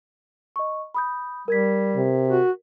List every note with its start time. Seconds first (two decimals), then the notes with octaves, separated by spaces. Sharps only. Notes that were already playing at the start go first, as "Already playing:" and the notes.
0.56 D#5 C#6
0.95 B5 D#6 G6
1.48 G3 A#4 G#6 B6
1.96 C3
2.28 F#4